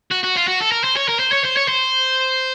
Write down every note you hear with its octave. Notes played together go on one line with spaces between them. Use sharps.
F#4
F#4
F4
F#4
A4
A#4
C5
C#5
A#4
C5
C#5
C5
C#5
C5